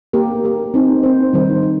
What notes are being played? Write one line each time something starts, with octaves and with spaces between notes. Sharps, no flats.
A#3 G4 A#4
A#3 G4 A#4
C4 D#4 C5
C4 D#4 C5
D#3 G3 D#4 C5
C5